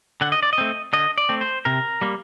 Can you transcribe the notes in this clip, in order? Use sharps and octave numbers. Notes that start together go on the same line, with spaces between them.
D3 F#5
D#5
D5
D#5
A3 C4
D3 D#5
D5
A3 C4
C5
C3 A#4
G3 A#3